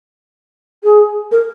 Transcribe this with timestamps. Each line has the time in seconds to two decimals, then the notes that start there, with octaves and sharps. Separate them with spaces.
0.84 G#4
1.32 A#4